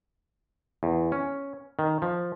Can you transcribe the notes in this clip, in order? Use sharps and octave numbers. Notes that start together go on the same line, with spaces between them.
E2
C#4
D#3
F3